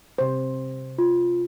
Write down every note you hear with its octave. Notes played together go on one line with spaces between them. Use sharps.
C3 C5
F4